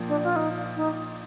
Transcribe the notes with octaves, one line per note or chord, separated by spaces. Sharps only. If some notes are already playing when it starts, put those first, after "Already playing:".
Already playing: A#1 A#2 F3
D4
F4
D#4
D#4